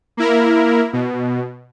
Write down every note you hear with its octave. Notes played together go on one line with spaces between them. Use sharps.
A#3 E4 A#4
B2